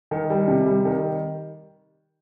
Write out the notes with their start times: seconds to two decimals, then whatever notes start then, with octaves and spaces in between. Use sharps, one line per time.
0.11 D#3
0.30 G3
0.48 C3
0.66 G3
0.85 D#3